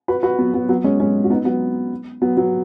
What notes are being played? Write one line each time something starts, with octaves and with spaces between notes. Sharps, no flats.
F#4 B4
F#4 B4
F#3 B3
F#3 B3
F#3 B3
G#3 C#4
G#3 C#4
F#4
B3 D#4
F#3 B3
F#3 B3
F#3 B3